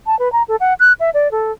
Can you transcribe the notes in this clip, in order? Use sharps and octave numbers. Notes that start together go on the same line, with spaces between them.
A5
B4
A#5
A4
F#5
F#6
E5
D5
A4